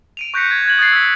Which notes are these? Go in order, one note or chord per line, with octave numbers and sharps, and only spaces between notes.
D7 D#7 F7
C#6 F#6 G6 A#6 B6 C#7
G#6
F#6 G#6 F#7
D#6 F#6 G6 A6 C7
E6 B6